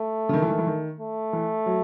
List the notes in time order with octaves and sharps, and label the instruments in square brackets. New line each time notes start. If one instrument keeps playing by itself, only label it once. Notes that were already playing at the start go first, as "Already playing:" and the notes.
Already playing: [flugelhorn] A3
[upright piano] C#3
D#3
E3
D#3
E3
D#3
[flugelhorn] A3
[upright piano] E3
F#3